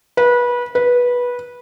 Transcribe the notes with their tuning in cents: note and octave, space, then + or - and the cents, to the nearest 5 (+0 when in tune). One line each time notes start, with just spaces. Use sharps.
B4 -25
B4 -15